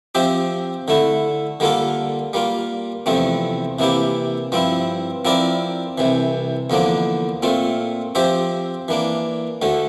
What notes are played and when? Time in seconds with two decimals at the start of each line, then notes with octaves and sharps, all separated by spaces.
0.15 F3 C4 G4 C5 E5
0.88 D3 A3 E4
1.60 D3 G3 A#3 F4 A4
2.33 G3 A#3 F4
3.06 E2 C3 F3 A3 C4
3.79 C3 E3 A#3 E4 G4
4.52 G2 F3 C4 E4
5.25 F3 C4 E4 A#4 D5
5.98 C2 C3 E3
6.70 E2 D3 F3 A#3 D4
7.43 A#2 A3 C4 F4
8.15 F3 C4 G4 C5 E5
8.88 E3 A#3 D4
9.62 D2 D3 A3